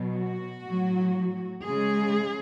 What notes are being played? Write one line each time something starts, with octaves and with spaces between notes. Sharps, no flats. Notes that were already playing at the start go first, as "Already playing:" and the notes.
Already playing: B2 F#3
F#4
A2 F#3
C#3 G#3 G#4